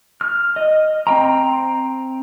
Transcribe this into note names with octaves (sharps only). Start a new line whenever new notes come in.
F6
D#5
C4 G5 A#5